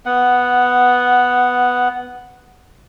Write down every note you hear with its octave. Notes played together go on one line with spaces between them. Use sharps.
B3 F#5